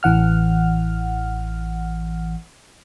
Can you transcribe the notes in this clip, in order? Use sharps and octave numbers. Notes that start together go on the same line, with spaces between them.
A1 E3 F#5 F6